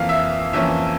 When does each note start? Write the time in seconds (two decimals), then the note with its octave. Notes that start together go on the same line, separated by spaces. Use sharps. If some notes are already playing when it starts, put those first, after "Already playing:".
Already playing: F2 E3 A#3 F5
0.09 E5
0.53 F2 E3 A#3 C#4 E5